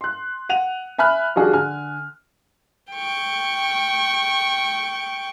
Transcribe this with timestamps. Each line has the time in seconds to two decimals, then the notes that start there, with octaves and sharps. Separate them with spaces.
0.01 C6 F#6
0.49 F#5 D#7 F7
0.98 E5 G#5 B5 F6 F#6
1.36 D#3 F3 G3 D4 F#4 G#4
1.53 D3 G#5 F6
2.93 G5 C#6